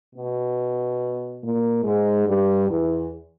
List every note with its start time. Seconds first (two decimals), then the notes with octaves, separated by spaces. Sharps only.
0.15 B2 B3
1.42 A#2 A#3
1.83 G#2 G#3
2.26 G2 G3
2.68 E2 E3